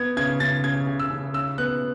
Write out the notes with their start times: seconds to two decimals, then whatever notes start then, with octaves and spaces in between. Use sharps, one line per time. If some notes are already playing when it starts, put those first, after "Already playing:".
Already playing: B3 G#6
0.17 C#3 G#6
0.40 C#3 A6
0.64 C#3 G#6
0.87 C#3
0.99 E6
1.10 C#3
1.34 C#3 E6
1.58 B3 F#6